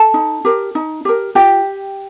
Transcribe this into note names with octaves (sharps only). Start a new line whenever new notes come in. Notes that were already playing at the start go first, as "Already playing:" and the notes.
Already playing: A4 A5
D#4
G4 A#4
D#4
G4 A#4
F4 G4 G5